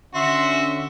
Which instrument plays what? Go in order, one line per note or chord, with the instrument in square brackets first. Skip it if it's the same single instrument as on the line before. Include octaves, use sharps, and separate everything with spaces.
[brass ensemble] D3 C#4 [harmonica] F#4 [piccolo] E5 [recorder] C6